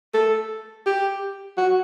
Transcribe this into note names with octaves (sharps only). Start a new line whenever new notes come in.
A4
G4
F#4